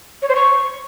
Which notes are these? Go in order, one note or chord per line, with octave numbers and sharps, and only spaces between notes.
C#5
C5
C#6